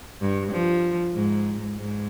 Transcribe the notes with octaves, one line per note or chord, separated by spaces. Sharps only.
G2
F3
G#2
G#2